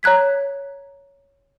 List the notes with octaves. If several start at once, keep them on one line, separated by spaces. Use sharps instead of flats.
C#5 A#5 F#6 G#6 B6